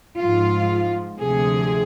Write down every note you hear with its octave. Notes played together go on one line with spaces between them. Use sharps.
G#2 F3 F4
D2 C3 F3 G#4